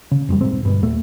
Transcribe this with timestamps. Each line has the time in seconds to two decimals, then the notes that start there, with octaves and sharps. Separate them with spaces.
0.11 C#3
0.29 F2 F3 G3
0.40 D#1 B1 G#2 C4
0.63 G1 G2 B2
0.82 D#2 A#2 A3